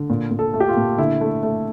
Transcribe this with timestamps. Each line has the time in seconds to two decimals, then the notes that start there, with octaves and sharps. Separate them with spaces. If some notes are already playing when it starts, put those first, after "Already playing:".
Already playing: D3
0.10 A#2
0.31 A#2
0.39 A4
0.54 A3
0.60 G4
0.69 F4
0.77 A#2
0.98 D3 E4
1.21 A3
1.43 A3